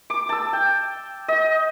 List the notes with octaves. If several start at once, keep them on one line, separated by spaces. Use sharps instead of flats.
D6
A5 E6
G5
D#5